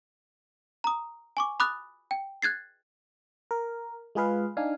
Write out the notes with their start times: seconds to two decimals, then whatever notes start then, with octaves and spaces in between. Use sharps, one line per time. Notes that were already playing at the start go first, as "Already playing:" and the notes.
0.84 A#5 D#6
1.37 G#5 C#6 D6
1.60 B5 D6 D#6 F#6 A6
2.11 G5
2.42 F#6 G#6 A6 C7
3.51 A#4
4.15 G#3 F4 G#4 B4 F5
4.57 D4 D#4 F5 G#5